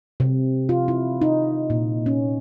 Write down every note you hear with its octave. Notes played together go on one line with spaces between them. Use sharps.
C3
F4
E4
D#4
A#2
C#4